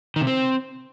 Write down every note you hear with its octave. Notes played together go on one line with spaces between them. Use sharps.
D#3
C3
C4